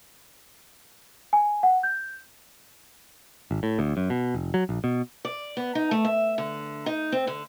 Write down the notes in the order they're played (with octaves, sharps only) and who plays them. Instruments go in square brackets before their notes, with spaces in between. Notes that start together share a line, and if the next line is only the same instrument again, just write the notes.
[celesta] G#5
F#5
G6
[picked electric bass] G#1
A2
D2
F#2
B2
F1
F#3
A#1
B2
[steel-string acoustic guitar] D5
B3
D#4
A3
E5
D3
D#4
C4
D3